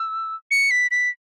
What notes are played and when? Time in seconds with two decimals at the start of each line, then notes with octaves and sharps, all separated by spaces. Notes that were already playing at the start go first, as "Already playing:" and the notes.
Already playing: E6
0.51 C#7
0.71 B6
0.91 B6